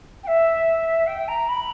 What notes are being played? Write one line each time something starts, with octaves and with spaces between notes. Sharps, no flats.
G5
E5
G5
A#5
B5